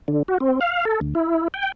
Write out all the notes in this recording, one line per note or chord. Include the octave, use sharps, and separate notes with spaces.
D3
F#4
C4
F5
A4
D2
E4
G5